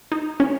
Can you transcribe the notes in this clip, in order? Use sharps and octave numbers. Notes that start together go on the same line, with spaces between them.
D#4
C#4